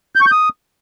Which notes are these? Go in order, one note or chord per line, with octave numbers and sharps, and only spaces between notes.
G6
C#6
G6
D#6